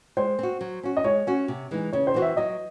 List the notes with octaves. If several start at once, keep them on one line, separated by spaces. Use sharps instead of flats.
G#3 C5
C4 F#4
F#3
C#4 F#4
D#5
G#3 C#5
C#4 F#4
C3
E3 G#3 D#4
C#3 C#5
C5
E3 C4 F#4
E5
F#3 D#5